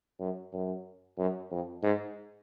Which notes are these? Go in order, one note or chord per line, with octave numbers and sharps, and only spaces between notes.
F#2
F#2
F#2
F2
G#2